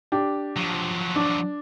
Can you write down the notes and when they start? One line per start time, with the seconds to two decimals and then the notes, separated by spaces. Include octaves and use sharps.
0.12 D4 G4
0.56 F3 F#3
1.16 D4